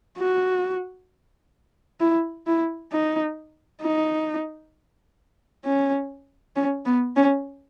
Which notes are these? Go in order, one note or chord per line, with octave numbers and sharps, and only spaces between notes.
F#4
E4
E4
D#4
D#4
C#4
C#4
B3
C#4